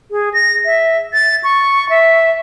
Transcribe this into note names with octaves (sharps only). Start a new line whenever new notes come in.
G#4
A#6
E5
A6
C#6
E5